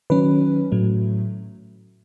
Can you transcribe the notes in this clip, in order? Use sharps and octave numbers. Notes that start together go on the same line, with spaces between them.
D#3 F#3 C#4 B4
A2 F#3 A3